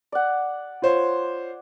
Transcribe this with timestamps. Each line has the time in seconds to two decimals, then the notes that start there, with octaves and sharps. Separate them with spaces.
0.12 D5 F#5
0.82 F4 C5 C#5